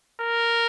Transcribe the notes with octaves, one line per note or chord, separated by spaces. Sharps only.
A#4